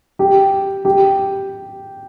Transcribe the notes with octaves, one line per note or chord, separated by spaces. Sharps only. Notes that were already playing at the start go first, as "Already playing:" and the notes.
G4
G4